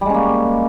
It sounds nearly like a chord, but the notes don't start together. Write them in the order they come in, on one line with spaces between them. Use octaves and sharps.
G3 G#3 C#4 A#3